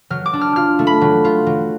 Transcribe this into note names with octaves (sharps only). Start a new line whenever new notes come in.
F#3 F6
D6
D4
F6
F4 F6
A3
B5
F#3
F4
F#3